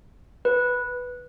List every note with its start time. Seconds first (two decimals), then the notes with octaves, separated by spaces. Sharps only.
0.45 B4